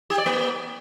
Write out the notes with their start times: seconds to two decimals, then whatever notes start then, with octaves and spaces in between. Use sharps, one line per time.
0.10 G4
0.18 D5
0.26 A#3